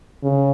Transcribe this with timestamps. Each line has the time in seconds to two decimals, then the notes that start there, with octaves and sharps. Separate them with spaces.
0.23 C#3